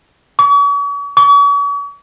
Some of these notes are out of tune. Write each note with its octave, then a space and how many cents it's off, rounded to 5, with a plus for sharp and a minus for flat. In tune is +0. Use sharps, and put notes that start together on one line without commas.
C#6 +45
C#6 +45